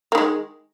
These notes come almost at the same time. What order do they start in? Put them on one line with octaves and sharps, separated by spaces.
A#3 D#3 G#3